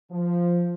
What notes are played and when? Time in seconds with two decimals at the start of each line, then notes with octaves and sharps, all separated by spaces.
0.11 F3